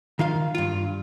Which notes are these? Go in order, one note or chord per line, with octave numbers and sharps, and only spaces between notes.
D#3 F4 F5
G2 F4